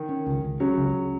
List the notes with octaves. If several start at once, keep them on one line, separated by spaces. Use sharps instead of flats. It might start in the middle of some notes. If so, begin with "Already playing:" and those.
Already playing: D#3
C#4
C#2
C#2
C#3 F#3 C#4
C#2